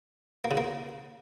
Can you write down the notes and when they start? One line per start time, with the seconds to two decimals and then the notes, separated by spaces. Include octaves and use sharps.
0.44 A#3
0.51 C#3
0.57 A#3